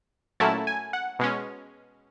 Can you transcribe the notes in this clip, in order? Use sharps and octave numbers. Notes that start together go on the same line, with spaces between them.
A#2 F#3 A3 C#4 E4 A5
G#5
F#5
B2 G#3 C#4